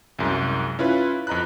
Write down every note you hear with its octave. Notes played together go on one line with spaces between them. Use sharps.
C2 F#2 G#3
C#4 E4 F4 B4
F2 D#5 A#5 B5 F#6